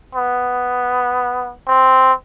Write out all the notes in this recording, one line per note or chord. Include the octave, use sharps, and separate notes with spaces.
B3
C4